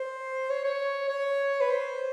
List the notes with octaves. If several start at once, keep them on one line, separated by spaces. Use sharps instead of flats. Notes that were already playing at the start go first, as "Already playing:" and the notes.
Already playing: C5
C#5
C#5
C#5
B4
C5